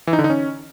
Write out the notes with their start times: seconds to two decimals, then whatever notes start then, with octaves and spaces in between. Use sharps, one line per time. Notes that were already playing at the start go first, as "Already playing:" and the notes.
0.07 E3
0.13 D#4
0.19 D3
0.24 D#4
0.30 C#4